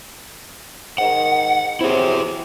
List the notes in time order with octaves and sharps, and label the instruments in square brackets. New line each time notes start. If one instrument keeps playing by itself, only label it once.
[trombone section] G#2 D#3 [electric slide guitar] F#5
[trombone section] C3 F#3 C4 [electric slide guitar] E4 G#4